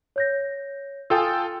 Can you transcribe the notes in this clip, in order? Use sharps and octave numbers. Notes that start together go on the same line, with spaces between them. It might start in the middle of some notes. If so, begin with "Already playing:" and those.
C#5 G6 A#6
F4 A4 G5 G#5 D#6 E6